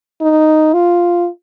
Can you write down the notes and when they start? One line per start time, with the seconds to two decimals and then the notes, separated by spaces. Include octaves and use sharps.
0.21 D#4
0.73 F4